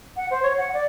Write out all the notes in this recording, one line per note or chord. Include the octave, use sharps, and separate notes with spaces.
F#5
C5
C#5
F#5
D5